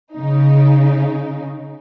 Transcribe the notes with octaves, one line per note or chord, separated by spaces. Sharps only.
C#3 D#4